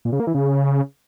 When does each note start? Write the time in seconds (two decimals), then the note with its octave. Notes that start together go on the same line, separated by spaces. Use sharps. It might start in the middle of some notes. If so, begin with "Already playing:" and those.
0.05 A#2
0.12 C#3
0.20 A#3
0.27 E3
0.34 C#3